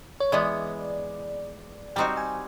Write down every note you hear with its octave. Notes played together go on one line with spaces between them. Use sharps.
C#5
E3 G#3 B3 D5
G3 C4 D#4 F#4 G5
G#5